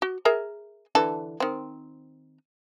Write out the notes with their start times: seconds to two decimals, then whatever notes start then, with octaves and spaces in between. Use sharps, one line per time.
0.02 F#4
0.25 G#4 A#4 E5
0.95 D3 E3 A4
1.40 D#3 C4